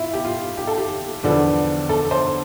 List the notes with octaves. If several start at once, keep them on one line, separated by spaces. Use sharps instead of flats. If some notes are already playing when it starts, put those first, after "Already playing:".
Already playing: E4 F4
G4
F4
G4
A4
G4
E2 D3 F3 B3 D4
A4
C5